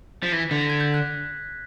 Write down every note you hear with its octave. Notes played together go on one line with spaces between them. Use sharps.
F3 B6
E3
D3 B6
A#6
G#6
G6
F#6